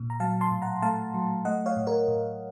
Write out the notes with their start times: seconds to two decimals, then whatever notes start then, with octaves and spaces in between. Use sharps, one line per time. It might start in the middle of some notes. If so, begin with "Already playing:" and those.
Already playing: A#2
0.10 A#5
0.20 F#3 F5 A5
0.41 A5 C6
0.51 A2
0.62 F#5 A#5
0.82 A3 F5 A5
1.14 F#3
1.45 A3 D#5 F#5
1.66 C#5 F5
1.76 A2
1.87 A#4 C#5
2.08 A2